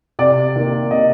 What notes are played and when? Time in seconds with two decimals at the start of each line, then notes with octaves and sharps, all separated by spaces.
0.19 C3 D5
0.56 D#3 A#3
0.91 C3 D#5